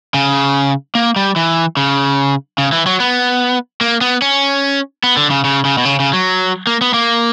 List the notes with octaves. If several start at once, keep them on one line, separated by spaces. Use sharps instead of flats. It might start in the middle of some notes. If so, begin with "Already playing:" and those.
C#3
A#3
G3
E3
C#3
C#3
E3
F#3
B3
A#3
B3
C#4
B3
D3
C#3
C#3
C#3
B2
C#3
C#3
F#3
A#3
B3
A#3